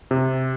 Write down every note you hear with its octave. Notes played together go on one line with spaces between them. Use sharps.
C3